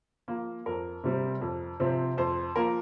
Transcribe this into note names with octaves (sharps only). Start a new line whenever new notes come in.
F3 A#3
F2 A#4
C3 G3 C4
F2
C3 F3 C4
F2 C5
F3 A#3 A#4